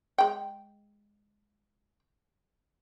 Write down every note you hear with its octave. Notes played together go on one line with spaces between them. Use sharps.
G#3 G5